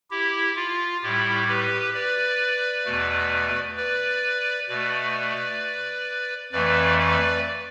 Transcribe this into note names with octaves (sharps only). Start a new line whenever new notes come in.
E4 G4
F4
A2 G3 E4 G4
G4 B4
B4 D5
E2 B2 A3
B4 D5
B2 A3 B4 D5
F2 E3 A3 B4 D5
B4 D5